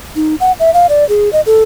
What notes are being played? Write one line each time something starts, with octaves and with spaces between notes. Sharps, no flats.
D#4
F#5
E5
F5
D5
G#4
D#5
A4